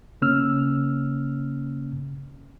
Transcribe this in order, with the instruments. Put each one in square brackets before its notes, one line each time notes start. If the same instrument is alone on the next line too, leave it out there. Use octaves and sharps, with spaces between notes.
[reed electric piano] C#3 A#3 C#4 E6 F6